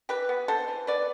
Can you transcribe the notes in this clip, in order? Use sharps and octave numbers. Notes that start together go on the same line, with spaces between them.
E3 G4 B4
B3
B3 A4 C5
E3
B3 B4 D5